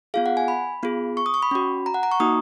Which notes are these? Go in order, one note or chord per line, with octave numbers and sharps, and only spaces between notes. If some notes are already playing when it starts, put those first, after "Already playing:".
B3 F4 G#4 F5
F#5
G#5
B5
B3 F4 G#4
C#6
D#6
C#6
B5
C#4 F#4
A#5
F#5
A#5
C#6
A#3 D#4 F#4 D#6